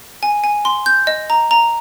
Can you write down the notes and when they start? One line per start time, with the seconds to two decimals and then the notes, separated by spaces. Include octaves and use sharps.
0.23 G#5
0.44 G#5
0.65 C6
0.86 G6
1.07 D#5
1.30 A#5
1.51 A#5